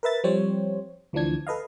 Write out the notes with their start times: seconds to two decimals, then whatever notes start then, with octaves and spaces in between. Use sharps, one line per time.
0.03 A#4 B4 E5 A6
0.24 F3 G3 C4 C5 C#5
1.13 D2 E3 F3 D4 G#6
1.47 A4 B4 D#5 F5